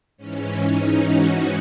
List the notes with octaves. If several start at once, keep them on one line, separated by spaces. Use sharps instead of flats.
G#2 E3 C#4
D#4
F#4